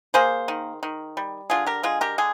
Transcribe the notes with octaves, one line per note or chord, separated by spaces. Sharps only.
A#3 G#4 C5
D#3
D#3
G3
D3 F4 G#4
G4 A#4
G#3 F4 G#4
G4 A#4
D3 G#4